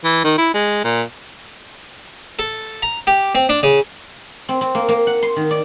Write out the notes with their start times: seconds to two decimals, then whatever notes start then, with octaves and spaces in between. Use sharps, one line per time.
0.04 E3
0.24 D#3
0.38 E4
0.54 G#3
0.84 A#2
2.39 A4
2.82 A#5
3.07 G4
3.35 C4
3.49 D4
3.63 C#3
4.49 C4
4.61 C4
4.75 A#3
4.89 A#3
5.07 F#5
5.23 C6
5.36 D#3
5.51 D5